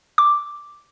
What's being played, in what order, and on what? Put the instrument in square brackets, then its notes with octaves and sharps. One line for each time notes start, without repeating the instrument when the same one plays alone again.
[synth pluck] D6